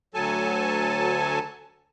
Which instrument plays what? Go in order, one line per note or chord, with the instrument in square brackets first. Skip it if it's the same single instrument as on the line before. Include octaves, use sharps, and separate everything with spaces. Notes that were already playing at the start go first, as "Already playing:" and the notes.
[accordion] D2 F#3 A4 G#5 A5